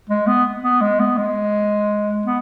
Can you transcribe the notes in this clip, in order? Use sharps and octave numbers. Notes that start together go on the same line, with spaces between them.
G#3
B3
B3
G#3
B3
G#3
B3